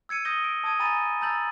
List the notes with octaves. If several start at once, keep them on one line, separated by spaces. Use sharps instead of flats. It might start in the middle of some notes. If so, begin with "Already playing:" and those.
E6 G#6 C#7 D#7
D#6 G6 A#6 D#7 G7
D7
A5 D#6 G#6 D#7
G#5 A#5 B5 D#6 A6 D#7
A5 A#5 E6 G6 A6 F#7